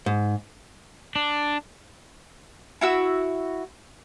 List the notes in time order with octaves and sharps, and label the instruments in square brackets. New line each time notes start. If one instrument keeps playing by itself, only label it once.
[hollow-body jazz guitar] G#2
[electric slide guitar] D4
[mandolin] E4 F#4 E6